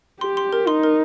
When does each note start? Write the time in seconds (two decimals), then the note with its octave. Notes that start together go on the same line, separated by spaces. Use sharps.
0.21 G4 C6
0.37 C6
0.53 A#4
0.67 D#4 C6
0.83 A#4